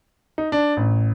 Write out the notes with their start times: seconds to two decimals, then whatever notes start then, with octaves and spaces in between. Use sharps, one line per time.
0.38 D#4
0.52 D4
0.77 A1